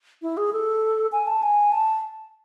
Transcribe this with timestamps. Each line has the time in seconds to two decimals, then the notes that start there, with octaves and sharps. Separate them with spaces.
0.22 E4
0.37 G#4
0.53 A4
1.12 G#5
1.27 A5
1.42 G#5
1.72 A5